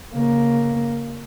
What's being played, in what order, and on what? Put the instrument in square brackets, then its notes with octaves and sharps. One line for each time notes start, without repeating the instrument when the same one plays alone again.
[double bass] C#3 A#3